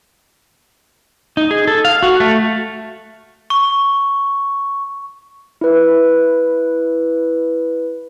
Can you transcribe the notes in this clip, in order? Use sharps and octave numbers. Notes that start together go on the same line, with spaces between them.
D#4
G#4
A4
F5
F#4
A3
C#6
E4 B4